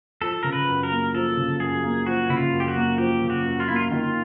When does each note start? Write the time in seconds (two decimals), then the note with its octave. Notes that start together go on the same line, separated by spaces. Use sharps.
0.22 F3 A4
0.43 C#3 A#4
0.53 B4
0.68 F#2
0.83 A#4
0.91 A#3
1.14 F3 A4
1.37 C#3
1.60 F#2 G#4
1.84 A#3
2.06 F3 F#4
2.29 C#3 E4
2.37 F4
2.53 F#2
2.60 G4
2.68 F#4
2.76 A#3
2.98 F3 G4
3.22 C#3
3.30 F#4
3.45 F#2
3.60 F4
3.68 A#3 E4
3.76 F4
3.91 D#3 F4